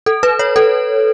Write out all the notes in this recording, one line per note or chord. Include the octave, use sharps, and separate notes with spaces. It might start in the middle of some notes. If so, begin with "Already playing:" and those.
A4
B4
C#5
A4